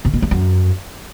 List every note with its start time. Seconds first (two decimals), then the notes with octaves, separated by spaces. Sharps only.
0.05 C3
0.14 B2
0.22 G2
0.31 F#2